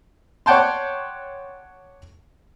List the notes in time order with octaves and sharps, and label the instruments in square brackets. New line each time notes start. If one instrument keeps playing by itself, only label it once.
[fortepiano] C#5 D5 F#5 G5 A5 C6